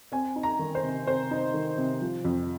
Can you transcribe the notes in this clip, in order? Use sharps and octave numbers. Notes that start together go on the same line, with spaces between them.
C4 G#5
D#4
A#5
D#3
C5
C3
C4 C5
D#4
D#3
C3
F3
F2